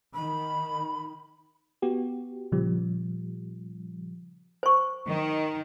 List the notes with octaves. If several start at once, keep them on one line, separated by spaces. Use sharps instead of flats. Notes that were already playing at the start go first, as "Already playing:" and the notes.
D#3 B5
B3 F#4 G4
A#2 C#3 F3 G3
C5 C#6
D#3